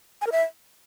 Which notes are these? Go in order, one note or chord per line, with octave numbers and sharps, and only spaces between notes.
G#5
A#4
E5